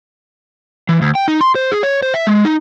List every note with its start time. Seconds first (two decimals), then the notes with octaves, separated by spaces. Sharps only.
0.89 E3
1.02 D2
1.15 G5
1.28 D#4
1.41 C6
1.55 C5
1.72 G#4
1.83 C#5
2.02 C5
2.14 E5
2.27 G#3
2.45 D#4